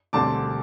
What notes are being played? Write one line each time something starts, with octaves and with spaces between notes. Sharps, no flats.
E1 D2 D3 G3 C4 A5 D6